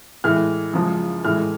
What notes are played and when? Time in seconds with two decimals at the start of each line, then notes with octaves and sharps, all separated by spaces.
0.24 A2 E3 G#3 F6
0.73 F#2 C#3 F3 G#3
1.24 A2 E3 G#3 F6